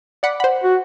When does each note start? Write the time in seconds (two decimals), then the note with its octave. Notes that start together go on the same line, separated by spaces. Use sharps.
0.23 D5 F#5 B5 D6
0.40 C5 F#5 B5
0.63 F#4